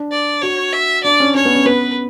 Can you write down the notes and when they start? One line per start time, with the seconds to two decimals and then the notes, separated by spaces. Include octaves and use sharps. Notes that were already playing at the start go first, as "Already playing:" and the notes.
Already playing: D4
0.11 D5
0.42 F#4 C#5
0.73 E5
1.04 D4 D5
1.20 C#4
1.35 C#4 C#5
1.45 B3
1.55 C#4
1.66 B3 B4